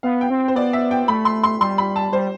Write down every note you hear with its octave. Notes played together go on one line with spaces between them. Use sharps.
B3 F5
G5
C4
C5
B3 D5
E5
G5
A3 B5
C6
C6
G3 C6
B5
A5
G3 C5